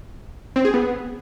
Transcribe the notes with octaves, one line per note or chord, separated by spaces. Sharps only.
C4
G#4
B3